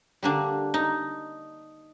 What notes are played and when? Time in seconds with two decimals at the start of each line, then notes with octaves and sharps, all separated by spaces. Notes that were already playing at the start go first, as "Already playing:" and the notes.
0.23 D3 G3 A#3 D4
0.74 D#4